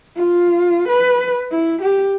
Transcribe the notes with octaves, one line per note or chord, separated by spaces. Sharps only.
F4
B4
E4
G4